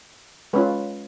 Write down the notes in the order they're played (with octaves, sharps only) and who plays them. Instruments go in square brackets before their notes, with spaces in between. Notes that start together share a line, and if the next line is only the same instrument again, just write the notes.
[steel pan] G#3 C#4 F4 B4